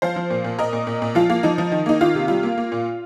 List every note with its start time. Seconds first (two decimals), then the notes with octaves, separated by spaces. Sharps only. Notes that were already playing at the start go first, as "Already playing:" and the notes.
0.02 F3 C5 F5
0.16 F3
0.30 A#2
0.44 A#2
0.59 A#2 A#4 D#5
0.73 A#2
0.87 A#2
1.02 A#2
1.15 F3 F4
1.29 A#3 F4
1.43 F3 D#4
1.58 F3
1.72 D#3
1.86 A#3 D#4
2.01 D#3 F4
2.15 C3
2.28 G3 F4
2.43 A#3
2.58 A#3
2.72 A#2